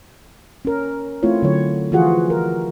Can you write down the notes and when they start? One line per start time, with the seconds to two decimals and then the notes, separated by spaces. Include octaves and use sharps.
0.65 C#4 A#4
1.23 A3 C4 E4 F4 C#5
1.43 D3 F#3 C#5
1.92 E3 F3 F4 F#4 G#4 F#5
2.30 A#4